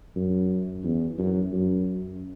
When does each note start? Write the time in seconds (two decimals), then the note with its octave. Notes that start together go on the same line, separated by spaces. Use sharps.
0.15 F#2
0.84 E2
1.18 F#2
1.52 F#2